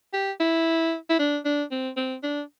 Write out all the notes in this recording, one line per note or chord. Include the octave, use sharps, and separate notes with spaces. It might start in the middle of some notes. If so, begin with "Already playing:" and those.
G4
E4
E4
D4
D4
C4
C4
D4